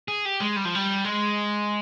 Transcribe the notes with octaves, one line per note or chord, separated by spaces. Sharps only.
G#4
G4
G#3
G3
F3
G3
G#3